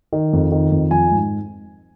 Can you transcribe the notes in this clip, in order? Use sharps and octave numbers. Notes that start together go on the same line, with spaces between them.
D#3
F2
D#3
F2
F3 G#5
G#2